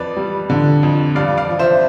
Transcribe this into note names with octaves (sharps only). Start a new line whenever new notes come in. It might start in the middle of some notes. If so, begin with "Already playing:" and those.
Already playing: F2 B4 D5
G3
D3
F2
G2 D5 F5
D5 F5
F3
C5 E5